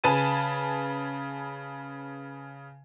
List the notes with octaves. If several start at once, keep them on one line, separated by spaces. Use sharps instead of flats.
C#3 B4 G#5 A5 D#7